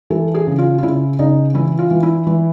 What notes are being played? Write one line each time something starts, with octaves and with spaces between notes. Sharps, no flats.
E3 A4
G#4
C#3
F4
F4
C#3 E4
C#3 D#4
E3 E4
F4
E3
E4
E3